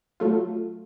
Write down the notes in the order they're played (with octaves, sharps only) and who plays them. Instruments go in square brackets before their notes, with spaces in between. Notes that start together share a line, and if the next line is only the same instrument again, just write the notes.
[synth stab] F#3 A3 F4